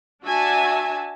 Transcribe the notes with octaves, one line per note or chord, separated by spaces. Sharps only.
D4 F#4 E5 G#5 A5